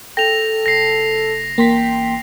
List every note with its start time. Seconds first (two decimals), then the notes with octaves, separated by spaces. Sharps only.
0.17 A4 G5 A#6 F7
0.66 F#1 A#6 C7
1.58 A1 A#3 G5 C6 B6